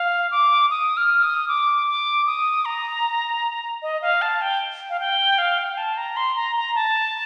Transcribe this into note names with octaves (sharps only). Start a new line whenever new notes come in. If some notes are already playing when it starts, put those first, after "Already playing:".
Already playing: F5
D6
D#6
F6
D#6
D6
D6
D#6
A#5
D#5
F5
A5
G5
F5
G5
F5
G5
A5
A#5
C6
A#5
A#5
A5